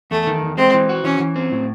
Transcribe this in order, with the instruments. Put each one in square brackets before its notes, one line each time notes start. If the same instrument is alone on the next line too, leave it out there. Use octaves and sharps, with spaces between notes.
[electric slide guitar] E2 [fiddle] A3
[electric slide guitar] D#3
E2
[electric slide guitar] G#3 [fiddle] C4
[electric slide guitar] E3
F#4
[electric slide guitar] E3 [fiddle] C#4
[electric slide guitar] E3
C4
A2